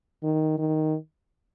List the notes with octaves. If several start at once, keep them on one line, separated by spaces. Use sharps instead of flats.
D#3
D#3